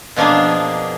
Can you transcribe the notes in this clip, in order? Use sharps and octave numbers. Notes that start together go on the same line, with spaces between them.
B2 F3 A#3 D4 G#4